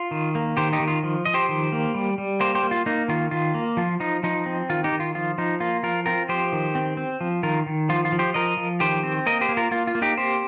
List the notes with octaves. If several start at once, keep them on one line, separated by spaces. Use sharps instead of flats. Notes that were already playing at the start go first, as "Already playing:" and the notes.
Already playing: F4
D#3
A#3
D#3 G4 C5
D#4 G4
D#3
F4
F3
F3 D#5
G4 C5
D#3
A#3
G3
G3
A#3 G4 C5
G4 C5
A#3
F4
A#3 D#4
D#3 F4
D#3 F4
A#3
F3 F4
F3 D#4
F3 D#4
C4
D#3 F4
D#4 G4
D#3
F4
F3 F4
F3 D#4
A#3 F4
F3 F4 A#4
C4 F4 A#4
F3 G4 C5
D#3
C4
C4
F3
D#3 F4 A#4
D#3
F3 F4
F4
F3
G4 C5
F3 A#4 D#5
F3
D#3 G4 C5
C4
A#3 A#4 D#5
G4 C5
A#3
F4 A#4
A#3 F4
F4
A#3
D#4 G4
C4 G4 C5